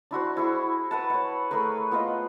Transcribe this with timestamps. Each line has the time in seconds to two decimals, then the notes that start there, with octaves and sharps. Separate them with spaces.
0.11 D4 E4 F#4 C5
0.37 E4 G#4 C#6
0.91 B4 F#5 A5
1.10 C#5 F#5
1.51 A3 G#4 A#4 B4
1.91 B3 F4 B4 D#5